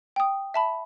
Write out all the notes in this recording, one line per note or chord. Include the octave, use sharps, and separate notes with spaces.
G5 D#6
E5 A5 B5